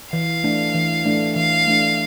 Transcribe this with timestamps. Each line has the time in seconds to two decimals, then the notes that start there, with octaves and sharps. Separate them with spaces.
0.13 E3 F5
0.44 A3 D4
0.75 E3
1.06 A3 D4
1.36 E3 F5
1.67 A3 D4